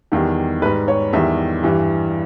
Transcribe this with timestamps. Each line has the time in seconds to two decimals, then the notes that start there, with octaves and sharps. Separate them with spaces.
0.12 E2 D#3 G3
0.62 G3 B4
0.65 G#2
0.88 C#5
1.13 E2 D#3 G3 E5
1.63 G2 E3 G3